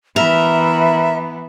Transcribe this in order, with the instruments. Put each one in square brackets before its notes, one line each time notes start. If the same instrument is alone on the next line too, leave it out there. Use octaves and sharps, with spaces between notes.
[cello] E3 B3 [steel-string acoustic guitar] A#4 [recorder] E5